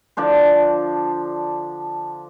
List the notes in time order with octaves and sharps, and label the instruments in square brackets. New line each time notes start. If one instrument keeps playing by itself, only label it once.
[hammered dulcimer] D3 F3 D4 C5